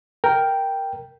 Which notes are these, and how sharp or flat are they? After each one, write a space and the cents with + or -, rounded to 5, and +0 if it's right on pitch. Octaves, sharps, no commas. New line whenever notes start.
A#4 +0 G5 +0